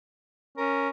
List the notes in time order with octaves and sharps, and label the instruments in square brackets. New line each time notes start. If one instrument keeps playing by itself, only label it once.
[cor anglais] C#4 [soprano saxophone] A#4